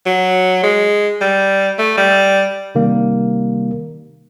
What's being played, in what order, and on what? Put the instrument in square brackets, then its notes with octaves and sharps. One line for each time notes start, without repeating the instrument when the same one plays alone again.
[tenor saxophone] F#3
G#3
G3
A3
G3
[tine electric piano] C3 D#3 G3 A#3